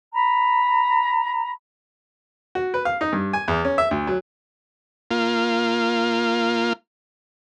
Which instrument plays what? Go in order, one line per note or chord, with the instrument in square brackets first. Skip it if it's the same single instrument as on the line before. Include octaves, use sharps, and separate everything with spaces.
[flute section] A#5 B5
[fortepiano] F#4
B4
F5
D#4
G2
G#5
E2
C#4
E5
D2
F#3
[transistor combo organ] A#3 F4